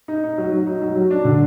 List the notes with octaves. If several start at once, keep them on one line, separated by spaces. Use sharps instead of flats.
D#4
D#4
F#3
F#3
D#4
F#3
F#3
D4
D3